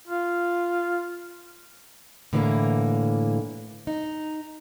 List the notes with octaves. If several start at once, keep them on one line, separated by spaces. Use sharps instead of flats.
F4
A2 D3 E3 G#3 A#3
D#4